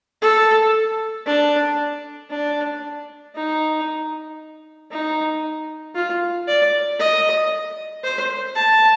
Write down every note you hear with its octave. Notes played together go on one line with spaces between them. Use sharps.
A4
D4
D4
D#4
D#4
F4
D5
D#5
C5
A5